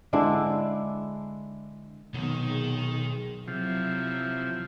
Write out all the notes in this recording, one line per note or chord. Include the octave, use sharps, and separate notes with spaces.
D3 G#3 D4 E4
B1 C3 D#3 B3
G#4
C3 F3 F#3 E4